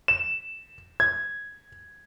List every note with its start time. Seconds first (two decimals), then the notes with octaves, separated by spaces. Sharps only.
0.08 E7
1.00 G#6